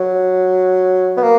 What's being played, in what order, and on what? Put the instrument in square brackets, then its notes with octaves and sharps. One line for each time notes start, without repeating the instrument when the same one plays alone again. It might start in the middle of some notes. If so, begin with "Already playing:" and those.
Already playing: [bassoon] F#3
B3
A#3